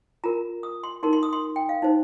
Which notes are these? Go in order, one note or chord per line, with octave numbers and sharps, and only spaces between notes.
F4 A#4 A#5
D#6
C6
D#4 A#4 C6
C6
D#6
C6
G5
F5
D#4 C5